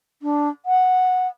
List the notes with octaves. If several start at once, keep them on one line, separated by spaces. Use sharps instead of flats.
D4
F#5